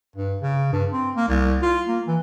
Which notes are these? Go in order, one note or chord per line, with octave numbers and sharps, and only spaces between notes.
G2
C#3
G2
C4
A#3
C2
F4
A#3
E3